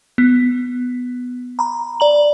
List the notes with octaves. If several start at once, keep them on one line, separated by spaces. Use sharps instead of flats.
B3
A#5 B5
D5 A#5 F#7